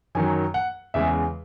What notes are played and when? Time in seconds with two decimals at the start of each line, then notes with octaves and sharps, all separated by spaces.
0.15 F#2 D#3 F#3 G#5
0.54 F#5
0.94 E2 C#3 G#3 E5